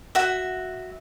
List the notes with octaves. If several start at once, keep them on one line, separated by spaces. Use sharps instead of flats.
F#4 E5